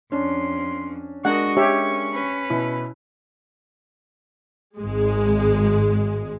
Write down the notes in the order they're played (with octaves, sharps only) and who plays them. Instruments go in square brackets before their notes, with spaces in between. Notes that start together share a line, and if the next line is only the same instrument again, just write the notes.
[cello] F2 [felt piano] C#4 D4 [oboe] C6
[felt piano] G#3 D4 A#4 [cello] F#4 D#5 [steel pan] F#5 [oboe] C#6
[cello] C#4 [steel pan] G4 C#5 E5
[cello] C#4 B4
[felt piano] B2 [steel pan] E4
[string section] G#1 G#3